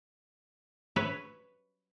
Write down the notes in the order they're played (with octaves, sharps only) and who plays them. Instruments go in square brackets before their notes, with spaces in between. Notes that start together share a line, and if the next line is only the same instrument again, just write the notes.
[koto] B4 C#5 E5